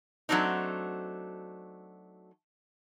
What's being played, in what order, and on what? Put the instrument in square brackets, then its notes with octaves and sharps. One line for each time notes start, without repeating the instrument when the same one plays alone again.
[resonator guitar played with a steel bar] F#3 A3 C4 D4 D#4